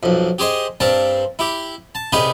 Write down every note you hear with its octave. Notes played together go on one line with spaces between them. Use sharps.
B1 F2
G4 G#4 C5 D#5
G2 C4 A#4 A5
E4 G4
A5
C2 D#4 G4 G#4 B4 C#6